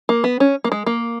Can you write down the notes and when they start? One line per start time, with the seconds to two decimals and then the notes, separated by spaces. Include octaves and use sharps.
0.09 A#3
0.24 B3
0.40 C#4
0.64 A#3
0.72 G#3
0.86 A#3